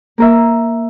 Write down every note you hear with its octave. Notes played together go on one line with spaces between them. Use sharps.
A#3 A#4 E5